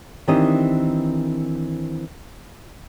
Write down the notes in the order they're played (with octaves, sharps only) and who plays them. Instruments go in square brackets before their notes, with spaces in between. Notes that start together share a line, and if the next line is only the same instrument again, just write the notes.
[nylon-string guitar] D#3 E3 C4 D4 G4 D#5